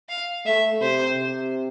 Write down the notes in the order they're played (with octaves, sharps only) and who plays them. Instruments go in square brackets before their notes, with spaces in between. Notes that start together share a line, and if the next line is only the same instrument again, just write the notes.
[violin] F5
[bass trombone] A3 [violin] E5
[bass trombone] C3 [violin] C5
[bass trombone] C3